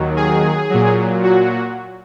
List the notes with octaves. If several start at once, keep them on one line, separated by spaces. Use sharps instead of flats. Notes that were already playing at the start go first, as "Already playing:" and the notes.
Already playing: D#2 D#3 F#3
G#4
A#2 F#3
F#4